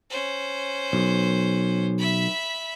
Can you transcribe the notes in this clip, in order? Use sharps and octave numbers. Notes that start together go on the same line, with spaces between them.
C#4 C5
B1
E5 B5